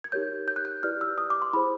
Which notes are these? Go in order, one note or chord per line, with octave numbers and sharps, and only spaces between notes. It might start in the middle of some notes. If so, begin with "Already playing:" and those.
G#6
D#4 G4 A#4 C#5 G6
G6
F#6
G6
E4 G4 B4 D5 F6
E6
D#6
D6
C6
E4 G#4 C5 B5